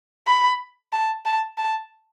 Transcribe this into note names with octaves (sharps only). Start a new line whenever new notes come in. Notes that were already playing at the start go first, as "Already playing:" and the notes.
B5
A5
A5
A5